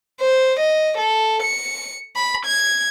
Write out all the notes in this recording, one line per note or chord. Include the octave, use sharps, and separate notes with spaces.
C5
D#5
A4
C#7
B5
G#6